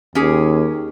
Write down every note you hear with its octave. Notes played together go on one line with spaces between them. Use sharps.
D#2 C#4 G4 G#4